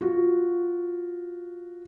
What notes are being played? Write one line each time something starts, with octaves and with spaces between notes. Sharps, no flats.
F4 F#4